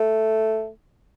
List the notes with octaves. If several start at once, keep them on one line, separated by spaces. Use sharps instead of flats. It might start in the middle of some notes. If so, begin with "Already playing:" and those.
Already playing: A3